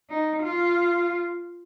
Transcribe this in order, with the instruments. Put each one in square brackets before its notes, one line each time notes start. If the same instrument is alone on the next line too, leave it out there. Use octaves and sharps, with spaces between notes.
[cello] D#4
F4